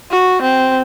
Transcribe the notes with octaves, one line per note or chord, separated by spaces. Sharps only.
F#4
C4